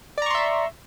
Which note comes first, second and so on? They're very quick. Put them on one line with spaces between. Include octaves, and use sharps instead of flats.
D5 A#5 C#6 C6 E5